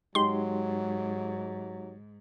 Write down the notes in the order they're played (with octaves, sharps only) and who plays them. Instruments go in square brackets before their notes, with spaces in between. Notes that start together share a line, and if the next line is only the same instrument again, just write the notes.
[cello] G#2 [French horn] F#3 [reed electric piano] G#3 D#4 G4 [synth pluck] C6